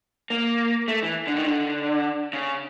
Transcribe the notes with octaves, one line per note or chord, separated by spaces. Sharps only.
A#3
A3
E3
D3
D#3
D3
C#3